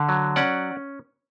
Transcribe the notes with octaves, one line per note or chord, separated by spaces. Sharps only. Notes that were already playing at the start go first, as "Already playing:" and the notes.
Already playing: D3
F#3
C#4 D5 F#5